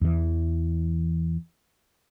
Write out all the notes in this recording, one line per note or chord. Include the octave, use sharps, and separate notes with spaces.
E2 E3